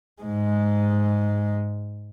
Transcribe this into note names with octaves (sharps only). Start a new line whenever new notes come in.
G#2 G#3